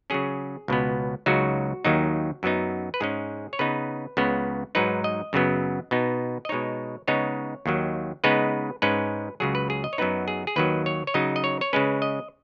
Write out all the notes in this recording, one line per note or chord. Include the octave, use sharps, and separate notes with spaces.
C#3 F#3 C#4 G#4
C#2 B2 B3
C#2 C#3 F#3 D#4 F#4
D#2 D#3 F#3 D#4
F#2 F#3 B3 D#4
B4
G#2 G#3 C#4 G#4
C#5
C#3 B3 D#4 B4
C#2 C#3 B3
G#2 F#3 D#4 B4
D#5
F#2 C#3 F#3 B3
B2 B3 D#4
D#5
B2 G#3 D#4 C#5
C#3 G#3 B3 D#4 C#5
D#2 D#3 F#3
C#3 G#3 B3 D#4 B4
G#2 G#3 C#4 B4
C#2 C#3 F#3 G#4
B4
G#4
D#5
C#5
F#2 F#3 B3 D#4 B4
G#4
G#4
D#2 D#3 F#3 B4
C#5
C#5
C#3 F#3 D#4 D#5
D#5
C#5
C#5
C#3 G#3 C#4 B4
D#5